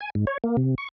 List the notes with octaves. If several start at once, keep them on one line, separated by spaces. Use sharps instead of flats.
G#5
G#2
C#5
A#3
C3
C#6